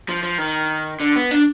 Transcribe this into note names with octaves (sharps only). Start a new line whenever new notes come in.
F3
F3
D#3
D3
B3
D4